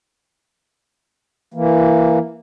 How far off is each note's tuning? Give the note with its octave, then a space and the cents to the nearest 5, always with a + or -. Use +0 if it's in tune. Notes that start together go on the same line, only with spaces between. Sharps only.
E3 +10 A#3 +0